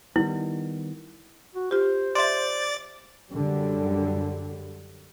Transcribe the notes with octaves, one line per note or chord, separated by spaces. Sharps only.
D#3 G3 B3 E4
F#4
F4 G4 C5
D5 E5 C6 A6
F#2 D3 G3